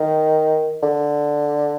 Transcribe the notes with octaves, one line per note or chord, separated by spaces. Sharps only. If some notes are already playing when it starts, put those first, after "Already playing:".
Already playing: D#3
D3